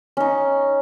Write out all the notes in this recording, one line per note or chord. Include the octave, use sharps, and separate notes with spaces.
C#4 D#4